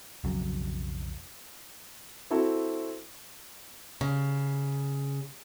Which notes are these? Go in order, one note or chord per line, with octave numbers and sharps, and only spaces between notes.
B1 F2 C#3 F#3
C4 E4 F#4 A4
C#3